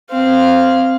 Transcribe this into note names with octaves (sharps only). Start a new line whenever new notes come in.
C4 F5